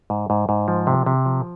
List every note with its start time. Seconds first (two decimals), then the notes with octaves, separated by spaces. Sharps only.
0.10 G#2
0.30 G#2
0.49 G#2
0.68 F3
0.87 C3
1.06 C3
1.26 F3